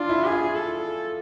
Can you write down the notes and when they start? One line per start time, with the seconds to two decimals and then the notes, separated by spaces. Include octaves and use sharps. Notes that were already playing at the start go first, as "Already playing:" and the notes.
Already playing: D4 F4
0.09 E4
0.24 G#4
0.31 F4
0.55 A4